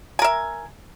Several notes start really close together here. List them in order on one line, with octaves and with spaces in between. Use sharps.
G#5 A#4 E5